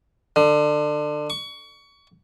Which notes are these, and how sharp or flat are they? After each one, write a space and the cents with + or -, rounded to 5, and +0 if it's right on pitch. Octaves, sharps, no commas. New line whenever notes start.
D3 +25
C#6 +25